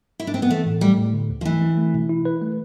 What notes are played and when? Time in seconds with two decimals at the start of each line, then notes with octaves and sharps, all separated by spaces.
0.20 E4
0.27 D4
0.34 C4
0.42 B3
0.50 E3 A3
0.66 A2
0.81 G3 A3
0.98 A2
1.13 D3
1.30 D2
1.41 F3
1.45 E3 A3
1.62 C4
1.77 A3
1.94 B2
2.09 E4
2.25 B4
2.42 A3